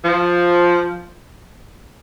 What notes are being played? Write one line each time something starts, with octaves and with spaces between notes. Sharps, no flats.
F3